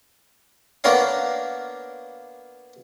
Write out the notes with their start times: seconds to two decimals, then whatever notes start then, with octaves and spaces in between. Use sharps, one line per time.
0.84 A#3 B3 D4 A#4 C#5 F5